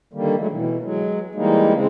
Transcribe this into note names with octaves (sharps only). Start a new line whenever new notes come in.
D3 D#3 G3 A#3
F#3 G#3 A3
B2 E3
F#3 G#3
E3 G3 G#3 A#3 D#4
C#3 G#3 C4